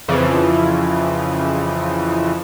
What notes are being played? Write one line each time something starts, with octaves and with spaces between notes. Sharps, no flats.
F2 C#3 E3 F3